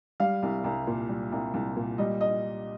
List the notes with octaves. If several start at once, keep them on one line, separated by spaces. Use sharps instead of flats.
G3 F5
C2
C2
A#2
G3
C2
C2
A#2
G3 D#5
D#5